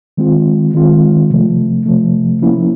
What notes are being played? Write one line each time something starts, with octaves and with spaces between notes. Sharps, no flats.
D#3 G#3 C4 F4
D#3 G#3 C4 F4
C3 F3 A3
C3 F3 A3
F3 A#3 C#4 E4